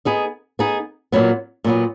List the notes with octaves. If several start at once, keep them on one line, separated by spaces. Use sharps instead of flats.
B3 D#4 G#4
B3 D#4 G#4
A#2 F#3 B3
A#2 F#3 B3